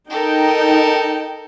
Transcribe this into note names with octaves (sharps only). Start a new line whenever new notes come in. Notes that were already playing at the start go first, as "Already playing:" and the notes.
D#4 A4 A#4 G5